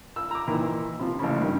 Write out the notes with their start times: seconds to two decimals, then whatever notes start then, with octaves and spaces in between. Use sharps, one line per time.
0.16 E6
0.31 A#5 D6
0.47 A#2 D#3 E3
0.99 C3 F3
1.19 A1 C#3
1.40 G2 D#3